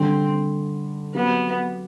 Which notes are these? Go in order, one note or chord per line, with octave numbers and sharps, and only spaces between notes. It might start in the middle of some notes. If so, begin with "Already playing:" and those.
Already playing: D3 G3 C4 D4 A4
F#3 B3 C4 G4